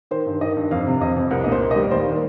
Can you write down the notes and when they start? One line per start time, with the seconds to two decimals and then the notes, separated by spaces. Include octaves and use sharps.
0.11 D#3 C5
0.26 G2
0.41 D#3 D#5
0.56 G2
0.71 F2 F5
0.87 C3
1.01 F2 D#5
1.17 F2
1.31 C2 A#4
1.44 A#2 D#5
1.52 C5
1.61 A#3
1.71 D#5
1.76 G3
1.83 A#4
1.91 D#2 C5
2.07 D#3 A#4